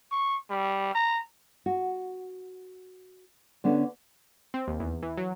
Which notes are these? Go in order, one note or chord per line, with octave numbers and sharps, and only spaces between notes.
C#6
G3
A#5
F#4
D3 B3 C#4 D4
C4
D#2
E2
E3
F#3